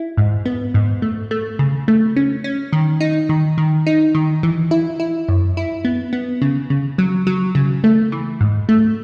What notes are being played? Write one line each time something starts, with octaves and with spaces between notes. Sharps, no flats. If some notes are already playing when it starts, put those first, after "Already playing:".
Already playing: E4
G#2
B3
G#2
A3
A3
C#3
A3
C#4
C#4
D#3
D#4
D#3
D#3
D#4
D#3
E3
E4
E4
F#2
E4
B3
B3
C#3
C#3
F#3
F#3
C#3
A3
E3
G#2
A3